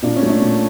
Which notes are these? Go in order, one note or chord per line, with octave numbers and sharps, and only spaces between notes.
A#2 D4
C#4
A3
D4
A#2